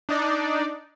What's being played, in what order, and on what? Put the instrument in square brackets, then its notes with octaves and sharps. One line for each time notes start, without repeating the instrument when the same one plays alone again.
[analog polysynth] D4 D#4 D5